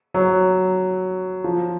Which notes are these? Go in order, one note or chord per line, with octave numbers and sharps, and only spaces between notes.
F#3
F3